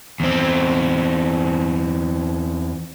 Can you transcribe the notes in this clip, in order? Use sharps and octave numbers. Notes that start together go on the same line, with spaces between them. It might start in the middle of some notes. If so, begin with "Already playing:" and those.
E2 C4